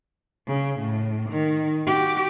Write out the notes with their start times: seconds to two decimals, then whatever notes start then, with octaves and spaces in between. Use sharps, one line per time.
0.47 C#3
0.80 A2
1.30 D#3
1.87 F#4 G4